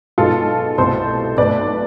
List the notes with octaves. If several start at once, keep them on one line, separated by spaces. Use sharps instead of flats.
B1 B2 G#3 F4 A4
C2 B2 A3 A4 C5
B1 B2 A3 B4 D5